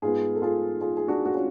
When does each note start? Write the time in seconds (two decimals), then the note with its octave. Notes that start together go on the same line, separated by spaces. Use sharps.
0.02 G#2 G#3 B3 F4 G#4
0.35 A4
0.42 F4 G#4
0.81 F4 G#4
0.97 G#4
1.08 D4 F#4
1.25 F#4
1.34 C#4 F4